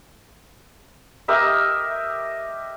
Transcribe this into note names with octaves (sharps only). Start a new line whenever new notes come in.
G4 A#4 D#5 E5